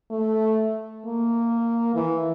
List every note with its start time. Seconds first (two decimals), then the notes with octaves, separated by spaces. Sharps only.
0.11 A3
1.06 A#3
1.95 E3